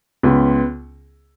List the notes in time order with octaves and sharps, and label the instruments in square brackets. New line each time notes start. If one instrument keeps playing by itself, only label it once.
[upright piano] C#2 B3